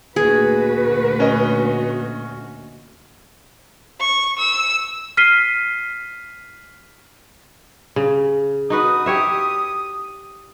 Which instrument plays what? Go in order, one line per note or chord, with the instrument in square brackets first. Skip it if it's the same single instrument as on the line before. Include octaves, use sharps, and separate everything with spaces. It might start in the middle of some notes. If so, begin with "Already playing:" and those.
[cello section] D2 A#2 F#4 [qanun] G#4 [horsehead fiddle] B4
[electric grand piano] C#4 D#5
[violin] C#6
E6
[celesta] F6 B6 C7 D#7 G7
[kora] C#3
[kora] D#4 F#4 B4 [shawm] D#6
[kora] G4 C#5 E5